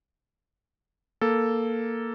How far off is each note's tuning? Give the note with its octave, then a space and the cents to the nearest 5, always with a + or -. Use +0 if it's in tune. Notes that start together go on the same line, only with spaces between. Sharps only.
A#3 +0 A4 +0